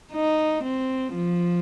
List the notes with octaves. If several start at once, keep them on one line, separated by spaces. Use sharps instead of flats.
D#4
C4
F3